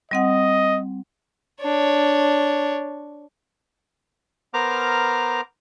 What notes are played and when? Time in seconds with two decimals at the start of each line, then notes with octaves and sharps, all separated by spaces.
0.11 G3 C4 D#5 F#5
1.61 D4 C#5
4.54 B3 A#4 C5 A#5 D6 F6